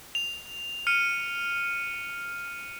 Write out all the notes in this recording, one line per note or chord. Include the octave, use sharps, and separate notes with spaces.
F7
F6 C#7 D#7